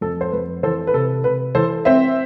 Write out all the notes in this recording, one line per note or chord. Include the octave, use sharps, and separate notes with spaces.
F2 A4
C5
F2 B4
E3 A4 C5
B4
C3 A4
C3 B4
E3 A4 C5
C4 C5 E5